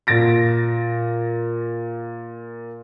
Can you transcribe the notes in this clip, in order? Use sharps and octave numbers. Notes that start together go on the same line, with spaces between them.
A#2 A6 A#6 D7